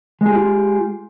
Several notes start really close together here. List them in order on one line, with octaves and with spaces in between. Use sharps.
G#3 G#4 G4 F4